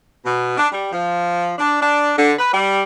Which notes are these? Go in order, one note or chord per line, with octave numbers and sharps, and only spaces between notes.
B2
D4
G3
F3
D4
D4
D3
B4
G3